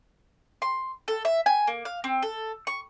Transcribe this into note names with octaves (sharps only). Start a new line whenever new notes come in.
C6
A4
E5
G#5
A#3
F5
C4
A4
C#6